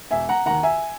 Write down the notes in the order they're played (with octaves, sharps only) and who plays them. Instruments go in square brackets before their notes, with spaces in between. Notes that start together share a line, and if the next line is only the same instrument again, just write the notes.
[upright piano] E1 E5 G#5
F#5 A#5
D#2 D#3 F#5 A#5
E5 G#5